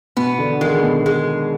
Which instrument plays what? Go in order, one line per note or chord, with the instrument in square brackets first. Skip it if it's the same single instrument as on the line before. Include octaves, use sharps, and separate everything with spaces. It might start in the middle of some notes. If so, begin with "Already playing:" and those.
[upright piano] B2 [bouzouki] B3
[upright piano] D3
[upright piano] D#3 [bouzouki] G#3
[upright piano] B2
[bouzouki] G#3